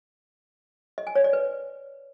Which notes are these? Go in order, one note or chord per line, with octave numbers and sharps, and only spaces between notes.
D#5
G#5
C#5
D5
B4